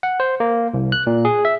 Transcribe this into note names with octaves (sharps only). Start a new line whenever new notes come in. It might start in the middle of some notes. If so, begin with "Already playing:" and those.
F#5
C5
A#3
C2
F#6
A#2
G#4
E5